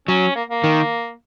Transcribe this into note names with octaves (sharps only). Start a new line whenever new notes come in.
F#3 C#4
A#3
A#3
D#3